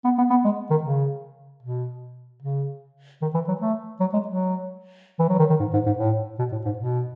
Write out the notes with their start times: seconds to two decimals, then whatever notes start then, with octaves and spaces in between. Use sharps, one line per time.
0.04 B3
0.18 B3
0.30 B3
0.44 G#3
0.70 D#3
0.83 C#3
1.62 B2
2.43 C#3
3.22 D#3
3.34 E3
3.48 F#3
3.61 A3
4.00 F#3
4.13 G#3
4.28 F#3
5.19 E3
5.29 F#3
5.39 D#3
5.50 D#3
5.60 G#2
5.73 G#2
5.86 G#2
5.98 A2
6.39 B2
6.52 A2
6.65 G#2
6.78 B2